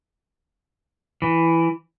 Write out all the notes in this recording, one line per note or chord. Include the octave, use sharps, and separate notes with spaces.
E3